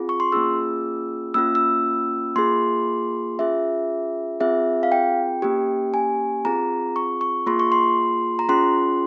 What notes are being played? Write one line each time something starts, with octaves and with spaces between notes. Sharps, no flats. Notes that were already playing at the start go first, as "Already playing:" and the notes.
Already playing: C4 F4 G#4
C#6
C6
A#3 C#4 F4 G#4 E6
A#3 C#4 F4 E6
E6
A#3 F4 G#4 C6
C#4 F4 G#4 E5
C4 F4 G#4 E5
F5
G5
A#3 C#4 G4
G#5
C4 F4 G#4 A#5
C#6
C#6
A#3 F4 G#4 C6
C#6
C6
A#5
C#4 F4 G#4 C6